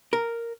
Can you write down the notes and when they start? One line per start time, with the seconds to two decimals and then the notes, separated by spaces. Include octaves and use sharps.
0.13 A#4